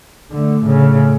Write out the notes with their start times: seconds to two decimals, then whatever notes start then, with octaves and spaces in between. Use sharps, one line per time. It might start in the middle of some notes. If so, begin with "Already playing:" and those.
0.31 D3 A3
0.64 A2 C#3